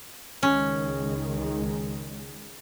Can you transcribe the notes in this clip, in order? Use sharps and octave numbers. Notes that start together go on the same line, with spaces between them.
C#2 D#3 G#3 C#4